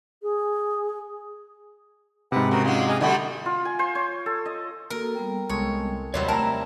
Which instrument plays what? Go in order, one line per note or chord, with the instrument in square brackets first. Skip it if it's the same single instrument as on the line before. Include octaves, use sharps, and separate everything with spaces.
[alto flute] G#4
[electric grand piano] G#2 C3 [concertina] B4 F#5
[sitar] C#3 [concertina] F#4 A#4
[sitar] F#3 G#3 [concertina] F4
[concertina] G#4 D#5 F5
[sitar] D3 F#3 G3 [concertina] A3 D4 E4
[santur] F4
G#5
C5
C#5
A4
D#5
[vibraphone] A#3 F#4 A4 [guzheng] A#4
[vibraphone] G3 B3 G5
[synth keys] C2 G#3 A4 [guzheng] C#5
[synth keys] D#2 F4 B4 [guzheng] C3 F#3 G3 [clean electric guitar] C#5 D#5
[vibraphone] A3 [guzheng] E4 A#4 [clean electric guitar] A5 A#5 [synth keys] E7